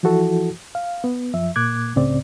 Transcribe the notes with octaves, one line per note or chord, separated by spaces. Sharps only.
E3 F3 E4 F#4 A4
F5
B3
F#2 F3 E5
A#2 A#3 D6 F#6 G#6
C#2 A2 C#3 C4 D5